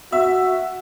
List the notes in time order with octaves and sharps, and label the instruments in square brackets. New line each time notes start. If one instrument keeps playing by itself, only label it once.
[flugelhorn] F#4 [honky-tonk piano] E5